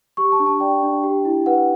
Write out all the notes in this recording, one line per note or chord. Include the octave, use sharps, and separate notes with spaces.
G4 C#6
A5
D4
A5
D5 G5
D4
G4
E4
B4 F#5